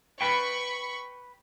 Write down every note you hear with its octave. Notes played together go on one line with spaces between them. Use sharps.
B4 G5 B5 C#6